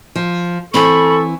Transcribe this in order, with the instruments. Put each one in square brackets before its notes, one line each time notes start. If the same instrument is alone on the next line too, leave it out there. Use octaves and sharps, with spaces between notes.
[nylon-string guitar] F3
[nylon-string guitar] E3 C4 [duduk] A4 [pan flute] B5 [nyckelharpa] C#6